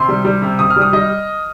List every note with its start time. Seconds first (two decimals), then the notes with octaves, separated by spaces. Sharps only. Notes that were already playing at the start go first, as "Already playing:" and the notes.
Already playing: C3 C6
0.08 G3
0.25 G3
0.42 C3
0.59 C3 D#6
0.70 F6
0.76 G3
0.82 D#6
0.93 G3 D#5